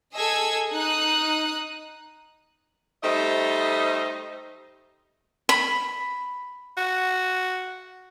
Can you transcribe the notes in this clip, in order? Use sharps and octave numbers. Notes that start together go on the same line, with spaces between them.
G#4 A4 D#5 E6 G#6
D#4 D#6 F#6
G3 A3 D#4 C5 D#5
B5
F#4